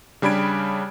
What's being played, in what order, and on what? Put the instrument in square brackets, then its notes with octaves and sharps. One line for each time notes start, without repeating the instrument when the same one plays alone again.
[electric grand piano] C#3 G3 D4 B5 G#6 D7